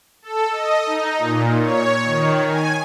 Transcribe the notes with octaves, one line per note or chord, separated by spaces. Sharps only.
A4
D#5
D#4
A#2
C#5
D#3
G#5